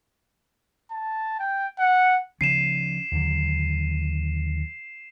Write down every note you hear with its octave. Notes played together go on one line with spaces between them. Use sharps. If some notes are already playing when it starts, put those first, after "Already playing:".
A5
G5
F#5
C#3 F3 C#4 C7 D#7 E7
D#2 D3 F#3